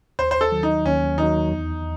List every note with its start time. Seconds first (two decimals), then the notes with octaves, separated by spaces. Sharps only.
0.19 D#2 C5
0.31 C5
0.41 A4
0.52 D#3 F#3
0.63 D#4
0.85 D#2 C#4
1.18 D#3 F#3 D#4
1.51 E2